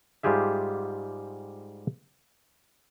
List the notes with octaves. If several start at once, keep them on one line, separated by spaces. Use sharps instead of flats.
G#2 G3 F4 G4 G#4 E5